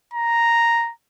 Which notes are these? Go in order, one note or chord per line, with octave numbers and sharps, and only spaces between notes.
A#5